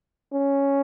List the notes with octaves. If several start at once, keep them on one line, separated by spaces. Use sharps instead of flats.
C#4